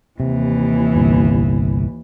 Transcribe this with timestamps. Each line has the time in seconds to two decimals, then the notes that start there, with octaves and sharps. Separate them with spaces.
0.20 D#2 C3 E3
0.96 G1 C2